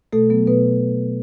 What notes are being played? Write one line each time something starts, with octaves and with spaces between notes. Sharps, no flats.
B2 A3 A4
F#3 B3
B2 B3 B4